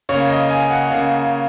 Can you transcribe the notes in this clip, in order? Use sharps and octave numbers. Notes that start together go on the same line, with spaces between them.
C#3 C#5
A#3
D#5
G#5
F#5
C#3 A#3